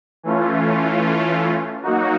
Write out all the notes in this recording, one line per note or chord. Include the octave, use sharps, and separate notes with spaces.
E3 A3 C#4 F4
F#3 A#3 D#4 F#4